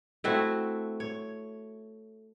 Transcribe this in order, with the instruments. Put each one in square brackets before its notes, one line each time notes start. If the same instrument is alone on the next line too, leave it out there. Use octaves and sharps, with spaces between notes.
[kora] A3 C4 E4 F#4
C#5